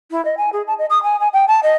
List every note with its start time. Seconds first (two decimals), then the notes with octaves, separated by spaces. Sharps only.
0.11 E4
0.25 D#5
0.38 G#5
0.53 G#4
0.67 A5
0.78 D#5
0.90 D#6
1.03 G#5
1.20 G#5
1.33 G5
1.48 A5
1.63 D#5